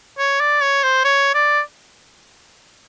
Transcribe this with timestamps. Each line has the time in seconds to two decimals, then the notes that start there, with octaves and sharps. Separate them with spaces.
0.18 C#5
0.40 D5
0.62 C#5
0.83 C5
1.04 C#5
1.34 D5